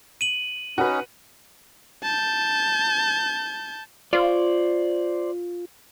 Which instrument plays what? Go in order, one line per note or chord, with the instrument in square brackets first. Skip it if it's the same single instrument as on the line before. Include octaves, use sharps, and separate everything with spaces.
[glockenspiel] D#7 F#7
[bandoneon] C#4 D#4 [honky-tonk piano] F#4 B4
[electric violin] A5 G6
[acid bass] F4 [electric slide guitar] C5 D5